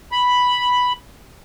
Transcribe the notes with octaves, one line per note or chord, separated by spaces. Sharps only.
B5